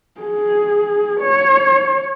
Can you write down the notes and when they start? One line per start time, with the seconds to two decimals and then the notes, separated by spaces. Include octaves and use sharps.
0.21 G#4
1.21 C#5